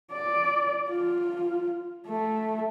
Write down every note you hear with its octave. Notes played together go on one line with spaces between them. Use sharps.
D5
F4
A3